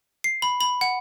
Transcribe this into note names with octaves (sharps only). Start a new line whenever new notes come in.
C7
B5
B5
F#5